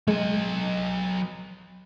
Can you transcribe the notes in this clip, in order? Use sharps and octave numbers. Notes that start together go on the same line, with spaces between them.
F#3 G#3 G#4 D#5